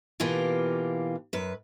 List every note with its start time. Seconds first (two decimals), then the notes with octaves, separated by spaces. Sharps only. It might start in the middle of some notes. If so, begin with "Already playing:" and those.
0.20 B2 E3 A#3 F4 G4
1.33 F#2 B4